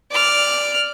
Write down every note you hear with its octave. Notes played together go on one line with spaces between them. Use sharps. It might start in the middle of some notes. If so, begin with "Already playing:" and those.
D5 F6